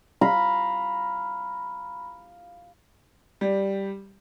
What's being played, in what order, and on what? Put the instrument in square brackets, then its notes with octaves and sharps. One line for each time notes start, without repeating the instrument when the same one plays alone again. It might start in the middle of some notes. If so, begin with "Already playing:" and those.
[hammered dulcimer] F5 A#5 B5
[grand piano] G3